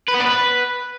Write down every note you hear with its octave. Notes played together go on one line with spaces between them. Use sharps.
B4
B3
D5
B4